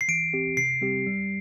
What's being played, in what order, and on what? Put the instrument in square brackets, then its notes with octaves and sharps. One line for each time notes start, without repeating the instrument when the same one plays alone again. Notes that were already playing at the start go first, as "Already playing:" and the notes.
[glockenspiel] C7
[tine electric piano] E3 [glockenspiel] D7
[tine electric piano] C4 G4
[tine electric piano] C3 [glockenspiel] C7
[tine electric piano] G3 C4 G4
G3